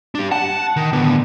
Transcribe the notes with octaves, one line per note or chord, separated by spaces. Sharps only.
D4 G4
F#5 A5
D#3
A2 D3 B3